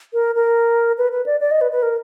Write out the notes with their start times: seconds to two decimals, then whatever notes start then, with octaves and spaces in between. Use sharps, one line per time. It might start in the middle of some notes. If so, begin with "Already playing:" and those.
0.13 A#4
0.35 A#4
0.98 B4
1.12 B4
1.26 D5
1.40 D5
1.51 D#5
1.61 B4
1.72 B4
1.82 A#4